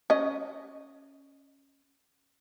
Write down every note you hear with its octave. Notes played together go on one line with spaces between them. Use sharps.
C#4 D#5